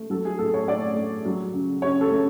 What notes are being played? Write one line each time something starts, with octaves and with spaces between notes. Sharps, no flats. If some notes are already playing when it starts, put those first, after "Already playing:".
Already playing: A3
F#3 A4
G#4
A2 A4
C#5
A2 D5
A3
F#3
C#3
C#3 C#5
A4
A3